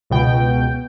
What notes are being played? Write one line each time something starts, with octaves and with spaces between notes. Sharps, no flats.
C#2 B2 G5